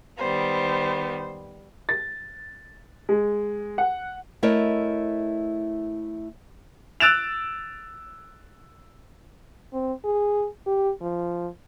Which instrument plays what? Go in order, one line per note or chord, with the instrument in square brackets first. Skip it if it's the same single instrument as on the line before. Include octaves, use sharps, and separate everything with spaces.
[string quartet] D#3 G3 B3 [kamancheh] C5
[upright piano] A6
G#3
F#5
[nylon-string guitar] A3 E4 A#4 C#5 D#5
[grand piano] E6 F#6 A6 D7 E7 F7
[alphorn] C4
G#4
G4
F3